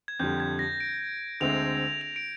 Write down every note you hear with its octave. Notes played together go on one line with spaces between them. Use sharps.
G#6
F2 D3 G3 G6
G#6
A#6
D7
D2 D3 G#3 C4 F7
F7
D7